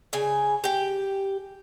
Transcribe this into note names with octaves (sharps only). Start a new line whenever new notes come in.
C#3 G#5
G4 G5